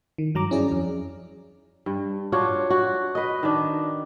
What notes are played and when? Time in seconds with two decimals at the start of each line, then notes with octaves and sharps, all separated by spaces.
0.18 D#3
0.35 G2 F#3 A#5 D6
0.51 C#4 E4 G#4 D5
0.72 F2
1.86 G2
2.32 D4 F4 F#4 C#5
2.70 F#4
3.15 B4 D#5
3.43 D#3 D4